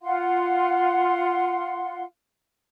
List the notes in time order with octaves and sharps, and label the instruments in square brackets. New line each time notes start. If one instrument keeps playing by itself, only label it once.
[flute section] F4 F5 F#5 C6